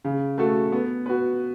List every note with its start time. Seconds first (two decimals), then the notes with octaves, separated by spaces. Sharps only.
0.04 C#3
0.38 A3 F#4 A4
0.72 B3
1.06 F#4 B4